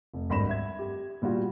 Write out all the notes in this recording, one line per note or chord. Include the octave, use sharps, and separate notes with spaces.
F1
G#1 D2 G2 B5 A#6 E7
E5 G#6
G4
A#2 G3 F4 F#4